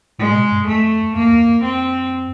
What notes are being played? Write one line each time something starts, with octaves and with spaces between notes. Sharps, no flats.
A2 G#3
B2
G2
F2 A3
F2 A#3
E2
F2
C4